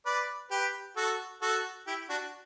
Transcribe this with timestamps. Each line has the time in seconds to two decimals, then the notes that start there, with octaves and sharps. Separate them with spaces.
0.06 B4 D5
0.51 G4 B4
0.96 F#4 A4
1.42 F#4 A4
1.87 E4 G4
2.09 D4 F#4